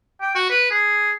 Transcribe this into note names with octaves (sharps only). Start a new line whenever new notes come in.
G5
F#4
B4
G#4